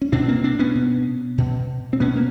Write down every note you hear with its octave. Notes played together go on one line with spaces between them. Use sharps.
C#4
B2 C4 D4
A#3 C4
C4 D4
B3 C#4
B2
B2
C4
B2 B3 C#4
A#3